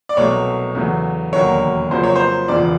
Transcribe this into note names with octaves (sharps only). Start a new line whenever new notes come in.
D5
C2 B2 F#3 A3 C#5
E2 C#3 F#3 A3
E1 D#2 D3 F#3 A#3 C#5
F2 C#3 F#3 A#3 C5
C#5
C5
E1 E2 C#3 F3 D5